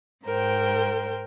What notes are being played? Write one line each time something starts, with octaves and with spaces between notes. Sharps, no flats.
G#2 A#4 C5 G5